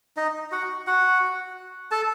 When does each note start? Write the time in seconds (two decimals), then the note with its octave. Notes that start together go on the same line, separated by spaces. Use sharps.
0.17 D#4 D#5
0.52 F#4 F#5
0.87 F#4 F#5
1.91 A4 A5